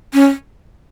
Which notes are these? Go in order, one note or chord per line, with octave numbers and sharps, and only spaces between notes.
C#4